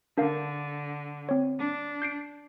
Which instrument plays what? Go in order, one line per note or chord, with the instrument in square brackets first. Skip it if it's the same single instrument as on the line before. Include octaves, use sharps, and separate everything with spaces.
[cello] D3 [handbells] D4 A#4 F5
[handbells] C4 C#5
[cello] D4
[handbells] G6 C7 D7